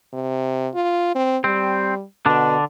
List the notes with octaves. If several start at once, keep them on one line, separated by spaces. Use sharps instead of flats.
C3
F4
C4
G3 C4
B2 D3 D4